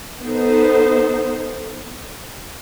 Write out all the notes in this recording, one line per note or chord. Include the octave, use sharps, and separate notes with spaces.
B3 D#4 A4 C5